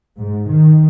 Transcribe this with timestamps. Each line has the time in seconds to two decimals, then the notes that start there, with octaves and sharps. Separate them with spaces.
0.18 G#2
0.48 D#3